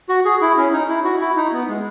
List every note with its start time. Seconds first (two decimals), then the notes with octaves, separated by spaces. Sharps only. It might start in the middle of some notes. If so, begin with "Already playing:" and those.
0.09 F#4
0.25 G#4
0.41 E4
0.57 C#4
0.72 D#4
0.88 E4
1.04 F#4
1.21 E4
1.36 D#4
1.52 B3
1.68 G#3